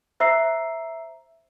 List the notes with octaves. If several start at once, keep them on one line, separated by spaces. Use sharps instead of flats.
C5 E5 A#5 E6 C7